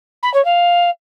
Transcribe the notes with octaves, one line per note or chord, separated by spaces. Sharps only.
B5
C#5
F5